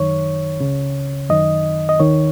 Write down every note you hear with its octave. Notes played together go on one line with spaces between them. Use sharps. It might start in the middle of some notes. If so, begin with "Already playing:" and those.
Already playing: F#2 D#3 C#5
C#2 C#3
F#2 D#3 D#5
D#5
D#2 D#3 C#5